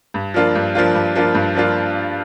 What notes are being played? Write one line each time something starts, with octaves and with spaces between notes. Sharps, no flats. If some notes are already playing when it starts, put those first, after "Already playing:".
G2
F3 A#3 D4 F4
G2
F3 A#3 D4 F4
G2
F3 A#3 D4 F4
G2
F3 A#3 D4 F4